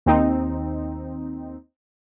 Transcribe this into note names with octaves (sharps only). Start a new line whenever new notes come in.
D#2 C4 D#4